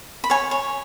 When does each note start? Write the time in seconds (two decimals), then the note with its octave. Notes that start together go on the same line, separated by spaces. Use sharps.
0.24 B5
0.30 C#5 G#5
0.51 C#5